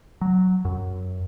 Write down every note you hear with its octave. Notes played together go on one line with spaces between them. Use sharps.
F#3
F#2